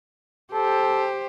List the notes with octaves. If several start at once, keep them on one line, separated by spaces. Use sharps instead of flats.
G4 A4 C5